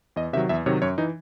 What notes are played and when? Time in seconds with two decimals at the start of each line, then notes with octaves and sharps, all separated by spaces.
0.16 E2 D#5
0.33 C3 D#3 F#3 E5
0.49 E2 E5
0.66 C3 D#3 F#3 C#5
0.82 F#2 C#5
0.98 E3 D#4